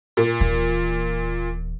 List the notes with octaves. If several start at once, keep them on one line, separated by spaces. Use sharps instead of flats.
A#2
D#1 E3